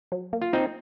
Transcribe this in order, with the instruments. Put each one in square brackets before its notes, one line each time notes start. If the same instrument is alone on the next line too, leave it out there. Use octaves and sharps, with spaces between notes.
[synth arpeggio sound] F#3
A#3
[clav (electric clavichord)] F4
[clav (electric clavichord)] C4 D#4 [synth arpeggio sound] F4